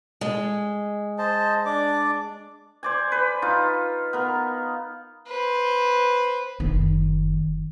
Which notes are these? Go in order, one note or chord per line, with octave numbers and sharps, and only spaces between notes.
G#3
C5 D#5 A5
D4 D5 D6
C5 D5 G#5
B4
D#4 F4
B3 A#4
B4 C5
F#1 D#3